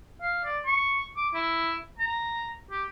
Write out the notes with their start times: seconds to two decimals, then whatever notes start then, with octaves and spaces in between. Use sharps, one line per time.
0.21 F5
0.45 D5
0.66 C#6
1.17 D6
1.34 E4
1.99 A#5
2.71 G4